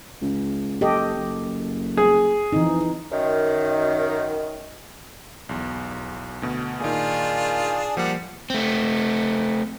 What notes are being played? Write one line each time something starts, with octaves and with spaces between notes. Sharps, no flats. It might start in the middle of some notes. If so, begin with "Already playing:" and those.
C#2
F#1 G4 A4 D#5
F#1
G#4
F2 E3 D#4
F#2 D#3
B1 E2
D2 B2
A#2 D#3 D4 F4 G#4
F3 G3 A#3 F#5
A3 C4